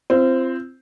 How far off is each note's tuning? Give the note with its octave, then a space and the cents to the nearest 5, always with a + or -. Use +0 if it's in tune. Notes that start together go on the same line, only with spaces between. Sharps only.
C4 +0 F4 -35